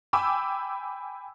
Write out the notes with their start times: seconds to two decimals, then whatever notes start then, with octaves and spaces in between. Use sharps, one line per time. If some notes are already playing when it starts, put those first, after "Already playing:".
0.13 G5 G#5 B5 D6 E6